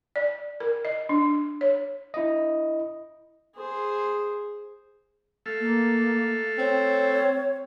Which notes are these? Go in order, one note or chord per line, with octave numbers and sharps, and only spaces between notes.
D5
A#4
D#5
D4
C#5
E4 D#5
G#4 C5
A3 A4 F5
A#3
C4 C#5